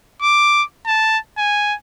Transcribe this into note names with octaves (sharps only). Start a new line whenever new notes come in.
D6
A5
G#5